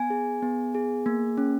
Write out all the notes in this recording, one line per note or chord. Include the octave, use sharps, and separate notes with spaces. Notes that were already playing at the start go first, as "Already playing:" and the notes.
Already playing: B3 G#5
G#4
B3
G#4
A#3
C#4